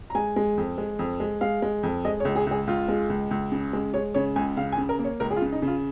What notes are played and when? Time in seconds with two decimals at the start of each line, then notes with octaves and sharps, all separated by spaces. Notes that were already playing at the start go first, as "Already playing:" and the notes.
0.10 A#5
0.15 G#3 G#5
0.36 G#3
0.57 F2
0.78 G#3
0.99 F2
1.20 G#3
1.41 G#3 F5
1.62 G#3
1.83 F2
2.05 G#3 D#5
2.20 C#5
2.25 C#2
2.36 G#4
2.47 C#2 G#4
2.67 C#2 F4
2.88 G#3
3.10 C#2
3.31 C#2
3.52 C#3
3.73 G#3
3.94 G#3 C#5
4.15 C#3 C#5
4.36 C#2 G#5
4.57 C#3 F5
4.72 G#5
4.78 C#3
4.89 A#4
4.99 A#3
5.04 C#5
5.20 C#2 A#4
5.31 G#4
5.36 F4
5.42 C#3
5.52 D#4
5.62 C#3
5.68 F4